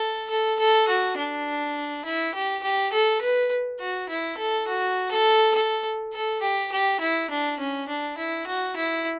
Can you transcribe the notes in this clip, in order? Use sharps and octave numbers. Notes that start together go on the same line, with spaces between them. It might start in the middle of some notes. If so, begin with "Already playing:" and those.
Already playing: A4
A4
A4
F#4
D4
E4
G4
G4
A4
B4
F#4
E4
A4
F#4
A4
A4
A4
G4
G4
E4
D4
C#4
D4
E4
F#4
E4